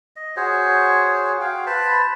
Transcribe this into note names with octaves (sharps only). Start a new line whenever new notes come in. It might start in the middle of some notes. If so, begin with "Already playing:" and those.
D#5
F#4 G#4 C5 C#5
F#4 F5 G5
B4 C5 A5 B5